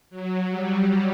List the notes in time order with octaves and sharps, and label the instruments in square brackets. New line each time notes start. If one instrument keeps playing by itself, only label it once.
[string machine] F#3
G3